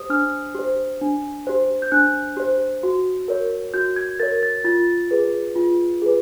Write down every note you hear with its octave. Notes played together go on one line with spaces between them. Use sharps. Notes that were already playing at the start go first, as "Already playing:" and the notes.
Already playing: G4 C5 D#6
D4 F6
G4 C5
D4
G4 C5
G6
D4 F#6
G4 C5
F#4
A#4 C#5
F#4 G6
G#6
A#4 C#5 A6
A6
F4 A6
G#4 B4
F4
G#4 B4